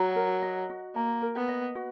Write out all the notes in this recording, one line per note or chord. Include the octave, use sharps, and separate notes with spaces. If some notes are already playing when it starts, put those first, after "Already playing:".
Already playing: F#3 F#4 A#5
A#4
D#5
F#4
A#3 A#5
A#4
B3
D#5
F#4